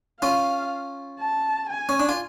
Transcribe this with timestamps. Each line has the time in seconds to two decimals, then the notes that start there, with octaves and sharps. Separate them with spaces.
0.21 C#4 F4 F5
1.20 A5
1.70 G#5
1.89 C#4
1.99 D4
2.09 F4